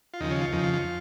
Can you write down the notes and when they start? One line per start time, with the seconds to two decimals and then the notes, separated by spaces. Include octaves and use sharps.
0.14 F4
0.20 D#2 C#3 F3 D#4
0.31 C#4
0.41 F4
0.52 F2 C#3 F3 D#4
0.63 F4
0.73 F4